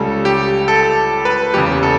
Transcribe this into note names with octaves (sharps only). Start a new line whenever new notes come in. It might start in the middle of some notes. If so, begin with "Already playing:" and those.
Already playing: C#2 C#3 G3 A4
G4
A4
B4
F#1 E2 C#3 G4
A4